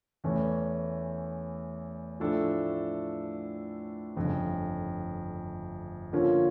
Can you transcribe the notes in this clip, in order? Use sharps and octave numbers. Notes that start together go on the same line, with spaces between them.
E2 E3 A3 C#4
A2 F3 A3 D4 A4
G1 F2 C#3
D3 F3 A#3 C#4 F4